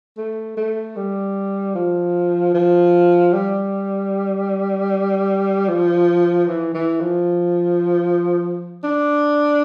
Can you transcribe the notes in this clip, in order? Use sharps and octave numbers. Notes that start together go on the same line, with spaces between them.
A3
A3
G3
F3
F3
G3
F3
E3
E3
F3
D4